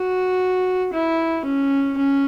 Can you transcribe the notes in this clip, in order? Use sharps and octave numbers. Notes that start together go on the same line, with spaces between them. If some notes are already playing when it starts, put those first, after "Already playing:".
Already playing: F#4
E4
C#4
C#4